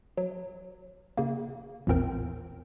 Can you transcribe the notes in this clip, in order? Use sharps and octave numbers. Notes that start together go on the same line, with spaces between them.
F#3
C#3 A#3
A1 E2 A#2 C4 A#4 G5